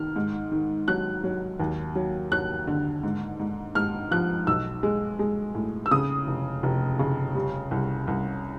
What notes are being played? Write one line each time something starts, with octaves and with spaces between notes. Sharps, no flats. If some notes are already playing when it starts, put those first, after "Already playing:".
Already playing: D#3 F6
G#2
D#3
F#3 F#6
F#3
D#2
F#3
F#3 F#6
D3
G#2
G#2
G#2 F6
F3 F#6
B1 E6
G#3
G#3
A2
E6
C#3 D#6
F1
F1
C#3
G3
C2
C2